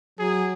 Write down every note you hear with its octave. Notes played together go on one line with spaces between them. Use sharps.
F#3 G#4